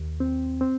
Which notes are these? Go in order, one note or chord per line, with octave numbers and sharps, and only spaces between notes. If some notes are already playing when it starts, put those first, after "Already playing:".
Already playing: D#2
C4
C4